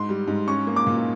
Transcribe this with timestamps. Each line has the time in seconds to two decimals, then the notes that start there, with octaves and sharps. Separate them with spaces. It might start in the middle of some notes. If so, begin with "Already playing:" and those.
Already playing: G#2 C6
0.09 G3
0.27 G#2
0.48 C#4 C#6
0.67 A#3
0.76 D6
0.87 A#2